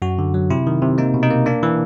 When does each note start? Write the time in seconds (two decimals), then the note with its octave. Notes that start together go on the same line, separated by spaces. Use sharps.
0.02 F#2 F#4
0.19 D3
0.34 F#3
0.50 C3 E4
0.67 D#3
0.82 C3
0.98 A#3 D#4
1.14 B2
1.23 D#4
1.30 A#3
1.46 A#3 D4
1.63 E3